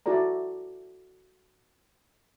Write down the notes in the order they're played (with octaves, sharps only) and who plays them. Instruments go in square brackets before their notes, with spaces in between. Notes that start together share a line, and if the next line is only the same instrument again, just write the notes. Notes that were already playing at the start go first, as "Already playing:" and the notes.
[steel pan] E4 F#4 A4 D5 A#5